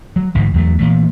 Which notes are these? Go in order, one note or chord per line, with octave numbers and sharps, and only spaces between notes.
F#3
A1 G#2 B2 D3
E2 F#3 A3
A#2 E3 A3